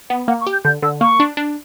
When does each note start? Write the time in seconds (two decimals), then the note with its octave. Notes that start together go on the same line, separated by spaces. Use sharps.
0.10 B3 F#5
0.28 A#3 F#5
0.41 C#6
0.47 G4
0.52 G6
0.64 D3 G6
0.83 D3 E6
1.01 A#3 C#6
1.20 D4
1.37 D4